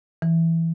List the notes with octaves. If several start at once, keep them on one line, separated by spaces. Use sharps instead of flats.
E3